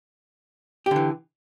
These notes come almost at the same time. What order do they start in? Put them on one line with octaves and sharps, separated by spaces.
G4 D3 E3